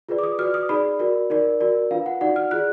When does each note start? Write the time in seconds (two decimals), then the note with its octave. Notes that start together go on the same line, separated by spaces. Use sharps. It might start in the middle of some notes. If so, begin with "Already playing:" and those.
0.09 F4 G#4 B4 D5
0.19 D6
0.23 D#6
0.39 F#4 B4 D5 F6
0.54 D#6
0.69 D#4 G#4 D5 B5
0.99 F#4 A#4 D5
1.30 D#4 A#4 D5
1.60 F#4 A#4 D5
1.91 D4 F4 B4 F5
2.06 F#5
2.21 D#4 F#4 D5 F#5
2.36 F6
2.51 F4 G#4 D5 F#6